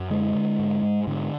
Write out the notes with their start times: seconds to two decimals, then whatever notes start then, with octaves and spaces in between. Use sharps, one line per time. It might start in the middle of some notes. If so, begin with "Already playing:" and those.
Already playing: F#2
0.10 D3 G#3
0.35 D3
0.59 G#2
0.83 G#2
1.07 G#2 D3